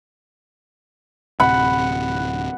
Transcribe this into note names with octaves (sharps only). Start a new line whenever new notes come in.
D1 C3 F#5 B5